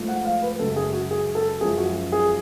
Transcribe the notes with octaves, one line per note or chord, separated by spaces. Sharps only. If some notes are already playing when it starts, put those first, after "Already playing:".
Already playing: G#2 F3 A3
F#5
F5
B4
F#2 C#3 G#3 A4
G#4
F#4
G#4
A4
F#2 F3 G#3 G#4
F#4
G#4